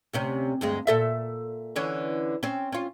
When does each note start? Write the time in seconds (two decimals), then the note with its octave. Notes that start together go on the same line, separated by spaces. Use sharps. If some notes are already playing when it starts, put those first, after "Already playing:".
0.13 D2 C3 C#4
0.61 D2 G2 G#3
0.87 A#2 A4 E5
1.76 D3 E3 C#4
2.43 C4 C#4
2.72 C#4 F4